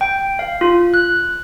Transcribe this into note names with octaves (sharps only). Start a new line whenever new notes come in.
G5
F5
F4
F#6